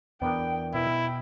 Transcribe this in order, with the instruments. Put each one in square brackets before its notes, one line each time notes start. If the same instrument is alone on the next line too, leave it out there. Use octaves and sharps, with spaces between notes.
[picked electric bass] E2 [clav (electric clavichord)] B3 D4 A#4 [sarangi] G5
[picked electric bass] B2 [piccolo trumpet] E4 [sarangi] G5